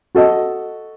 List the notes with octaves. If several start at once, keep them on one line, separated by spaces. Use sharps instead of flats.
F#4 A4 D#5